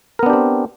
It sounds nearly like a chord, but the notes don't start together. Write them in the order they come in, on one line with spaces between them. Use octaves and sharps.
A#4 B3 D4 G4 C4